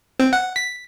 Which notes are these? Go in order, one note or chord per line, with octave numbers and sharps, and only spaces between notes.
C4
F#5
B6